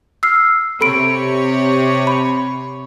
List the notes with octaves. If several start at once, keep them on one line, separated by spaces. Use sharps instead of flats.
E6 F6 C7
C3 A4 C#5 B5 D7
B5